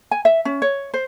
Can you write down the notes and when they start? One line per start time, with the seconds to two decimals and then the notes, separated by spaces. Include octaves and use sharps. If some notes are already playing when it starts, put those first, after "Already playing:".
0.11 G#5
0.25 E5
0.45 C#4
0.62 C#5
0.94 C5